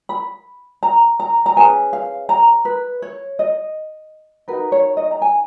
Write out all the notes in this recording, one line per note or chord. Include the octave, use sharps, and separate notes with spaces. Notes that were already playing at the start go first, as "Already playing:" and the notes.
B5
A#5
A#5
A#5
C#4 G#4 B4 G#5
F5
A#5
B4
C#5
D#5
D#4 F#4 A#4 B4
C#5
D#5
A#5
G#5